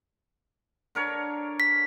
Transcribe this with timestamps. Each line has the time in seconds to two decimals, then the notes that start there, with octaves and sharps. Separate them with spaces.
0.95 D3 A#4 C#5
1.60 B6